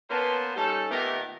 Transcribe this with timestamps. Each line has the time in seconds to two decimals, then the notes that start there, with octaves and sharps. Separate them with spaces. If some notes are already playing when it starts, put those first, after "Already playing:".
0.10 A#3 B3 C#4 B4 C5 A5
0.56 G3 C#4 D#4 A4
0.91 A#2 D#3 A3 B3 G4 A#4